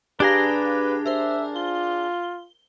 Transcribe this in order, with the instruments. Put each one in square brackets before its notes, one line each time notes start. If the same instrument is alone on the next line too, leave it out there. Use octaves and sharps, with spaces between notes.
[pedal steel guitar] D4 G#4 A#5 [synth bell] G4 F5 [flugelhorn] B4
[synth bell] A#4 C5 [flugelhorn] E5
[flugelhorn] F4 [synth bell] G7